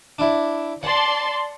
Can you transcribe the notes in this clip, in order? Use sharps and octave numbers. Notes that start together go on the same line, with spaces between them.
D4 E4
D5 F#5 A5 C6